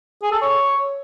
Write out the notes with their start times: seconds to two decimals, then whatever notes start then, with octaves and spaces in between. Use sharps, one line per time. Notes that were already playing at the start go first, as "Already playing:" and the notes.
0.22 G#4
0.32 A4
0.42 C#5